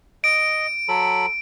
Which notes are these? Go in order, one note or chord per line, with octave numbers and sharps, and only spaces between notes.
D#5 D7
F#3 A4 B5